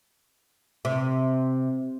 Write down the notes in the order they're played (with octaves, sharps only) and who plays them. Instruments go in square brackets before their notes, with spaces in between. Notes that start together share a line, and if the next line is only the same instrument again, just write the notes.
[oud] C3